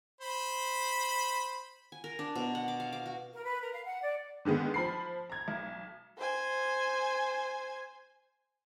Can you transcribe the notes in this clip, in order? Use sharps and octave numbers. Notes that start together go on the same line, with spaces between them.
C5 B5
G#5
A#4
D4
B2
F#5
D6
F5
D6
F#4
A#4
B4
A#4
F5
F#5
D5
D3 D#3 G#3 B3
F3 B5 C7
A#5 G#6
B1
C5 G#5